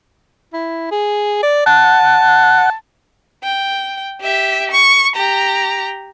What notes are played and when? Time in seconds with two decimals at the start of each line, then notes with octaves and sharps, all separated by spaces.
0.53 E4
0.91 G#4
1.43 D5
1.66 F#5 A5
3.44 G5
4.21 G4 E5
4.72 C#6
5.16 G4 A#5